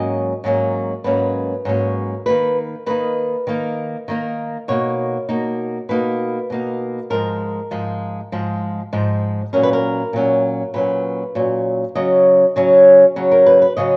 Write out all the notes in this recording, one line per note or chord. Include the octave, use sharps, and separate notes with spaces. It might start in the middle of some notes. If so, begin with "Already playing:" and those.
Already playing: G#2 F#3 A#3 C#4 D#5
G#2 F#3 A#3 C#4
G#2 F#3 A#3 C#4 B4
G#2 F#3 A#3 C#4
D#3 A#3 D#4 B4
D#3 A#3 D#4 B4
D#3 A#3 D#4
D#3 A#3 D#4
B2 A#3 D#4 C#5
B2 A#3 D#4
B2 A#3 D#4 B4
B2 A#3 D#4
G#2 F3 G#3 A#4
G#2 F3 G#3
G#2 F3 G#3
G#2 F3 G#3
A#2 F#3 C#4 A#4
B4
A#4
A#2 F#3 C#4
A#2 F#3 C#4 B4
A#2 F#3 C#4
C#3 F#3 C#4 D#5
C#3 F#3 C#4
C#3 F#3 C#4
A#4
B4
B4
C#3 F#3 C#4 D#5